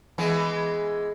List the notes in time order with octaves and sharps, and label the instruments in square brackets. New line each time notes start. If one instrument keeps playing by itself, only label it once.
[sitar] E3 G#3 B3